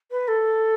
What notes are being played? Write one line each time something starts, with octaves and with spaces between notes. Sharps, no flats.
B4
A4